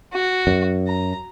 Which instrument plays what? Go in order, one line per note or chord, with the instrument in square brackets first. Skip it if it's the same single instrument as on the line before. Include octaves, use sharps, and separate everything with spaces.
[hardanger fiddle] F#4
[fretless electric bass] F#2
[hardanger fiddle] A#5